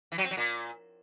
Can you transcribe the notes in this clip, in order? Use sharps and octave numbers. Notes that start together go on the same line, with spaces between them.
E3
F#3
C4
F#3
A#2